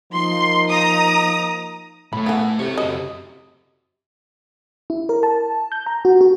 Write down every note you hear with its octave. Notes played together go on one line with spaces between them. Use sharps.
F3 A#3 D#4 C6
A#5 D#6
A2 A3 B5
D#3 E3 B3
C3 A4 C#5
C#3 F#4 D#5
E4
A#4
A5
G6
A#5
F#4
F#4